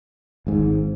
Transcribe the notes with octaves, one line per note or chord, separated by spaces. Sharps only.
G#1 G#2